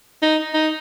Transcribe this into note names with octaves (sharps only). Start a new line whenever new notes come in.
D#4
D#4